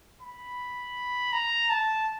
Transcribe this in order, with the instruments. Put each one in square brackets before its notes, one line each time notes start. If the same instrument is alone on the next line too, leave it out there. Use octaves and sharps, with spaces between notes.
[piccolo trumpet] B5
A#5
A5